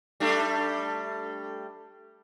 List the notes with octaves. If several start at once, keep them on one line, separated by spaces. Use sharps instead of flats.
G3 A3 D4